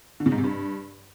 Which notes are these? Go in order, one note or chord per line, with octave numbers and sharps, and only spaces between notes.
D3
C#3
G#2
C3
G2